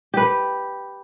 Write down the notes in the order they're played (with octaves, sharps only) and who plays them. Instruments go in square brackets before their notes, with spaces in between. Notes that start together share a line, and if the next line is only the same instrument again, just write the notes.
[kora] G4 B4